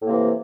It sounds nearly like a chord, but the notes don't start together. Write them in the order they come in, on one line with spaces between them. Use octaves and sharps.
A2 A#3 C3 E3